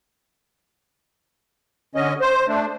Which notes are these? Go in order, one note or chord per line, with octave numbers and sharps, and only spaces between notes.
D3 C#4 D#5
C5
A3 D4